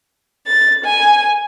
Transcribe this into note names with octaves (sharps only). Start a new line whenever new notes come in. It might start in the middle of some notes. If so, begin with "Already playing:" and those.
A6
G#5